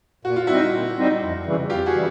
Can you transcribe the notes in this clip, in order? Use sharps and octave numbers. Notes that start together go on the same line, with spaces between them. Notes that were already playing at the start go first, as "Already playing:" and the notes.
A#2 F#4
F4
G3 C4 D#4 E4 F#4
A#2
G3 C4 D#4
F2
C#3 E3 G3
F2 F4 G4
F#4 G#4
C#3 E3 G3